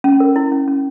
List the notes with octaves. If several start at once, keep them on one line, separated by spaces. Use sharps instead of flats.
C#4
A#4
E4
C#4
C#4